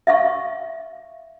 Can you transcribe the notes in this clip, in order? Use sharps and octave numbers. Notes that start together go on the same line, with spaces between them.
E5 F5 C#6